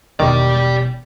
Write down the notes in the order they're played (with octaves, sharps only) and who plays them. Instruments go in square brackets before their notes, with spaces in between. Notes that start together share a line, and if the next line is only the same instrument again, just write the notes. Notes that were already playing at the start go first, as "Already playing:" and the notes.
[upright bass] E1 [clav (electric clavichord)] D#3 [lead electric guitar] G4 D5